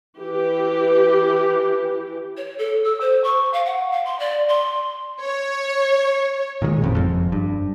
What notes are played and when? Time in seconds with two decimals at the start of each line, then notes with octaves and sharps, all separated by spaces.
0.20 E3 G4
2.37 C#5
2.59 A4
2.84 E6
3.01 C5
3.24 C#6
3.53 F5
3.66 F#5
3.92 F5
4.05 C6
4.19 D5
4.49 C6
5.22 C#5
6.62 A#2 D#3 F#3 G#3
6.82 A1 F2 G#2
6.95 F#1 F2
7.32 G2